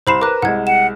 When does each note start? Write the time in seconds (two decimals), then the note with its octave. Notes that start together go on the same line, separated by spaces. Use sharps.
0.07 C2 C5 B5 C6 C7 E7
0.21 A#4 B4 D6 F#6
0.42 C2 G#3 F#5 G#6
0.67 F#5 E7